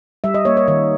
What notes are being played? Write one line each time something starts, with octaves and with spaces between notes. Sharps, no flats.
G3 E5
D#5
A#3 C#5
C#5
D#3 C#5